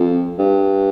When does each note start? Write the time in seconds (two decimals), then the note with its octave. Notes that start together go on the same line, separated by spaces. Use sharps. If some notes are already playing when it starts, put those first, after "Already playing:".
Already playing: F2
0.39 G2